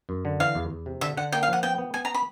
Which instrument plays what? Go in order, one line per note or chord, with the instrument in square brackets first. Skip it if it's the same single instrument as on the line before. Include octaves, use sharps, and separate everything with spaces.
[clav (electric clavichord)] F#2
D3
[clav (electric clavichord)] E3 [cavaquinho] F5
[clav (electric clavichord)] E2
E2
C3
[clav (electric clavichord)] D3 [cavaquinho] E5
[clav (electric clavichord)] D3 [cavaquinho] F#5
[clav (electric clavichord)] A#3 [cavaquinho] G5
[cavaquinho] F5
[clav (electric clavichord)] F3 [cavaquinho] F#5
[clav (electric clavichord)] B3 [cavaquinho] G5
[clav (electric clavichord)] B3
[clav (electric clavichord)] B3 [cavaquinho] G#5
[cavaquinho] A#5
B5